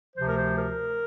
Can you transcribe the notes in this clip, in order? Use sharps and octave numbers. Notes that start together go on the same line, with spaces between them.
D2 C3 F3 C5
A#4
C5
A#4